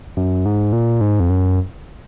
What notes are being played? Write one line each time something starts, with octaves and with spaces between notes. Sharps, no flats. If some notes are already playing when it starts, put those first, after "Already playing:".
F#2
G#2
A#2
G#2
F2
F#2